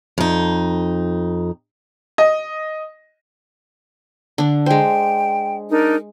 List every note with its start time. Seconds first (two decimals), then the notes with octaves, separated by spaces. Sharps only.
0.18 F2 D#4
2.18 D#5
4.38 D3 D4
4.66 G#3 C5 G5
5.70 D4 D#4 A#4